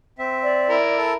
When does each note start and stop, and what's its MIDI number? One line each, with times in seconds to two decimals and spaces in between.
0.19 0.76 60
0.19 0.76 76
0.43 0.98 74
0.69 1.16 64
0.69 1.16 70
0.98 1.14 69